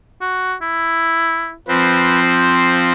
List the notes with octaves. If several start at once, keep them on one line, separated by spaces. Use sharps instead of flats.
F#4
E4
F3 C4 B4
C5